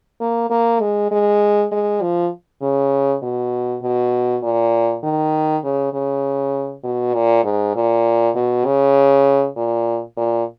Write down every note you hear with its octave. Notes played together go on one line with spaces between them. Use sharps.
A#3
A#3
G#3
G#3
G#3
F3
C#3
B2
B2
A#2
D#3
C#3
C#3
B2
A#2
G#2
A#2
B2
C#3
A#2
A#2